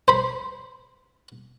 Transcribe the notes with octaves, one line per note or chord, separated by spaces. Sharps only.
C5 B5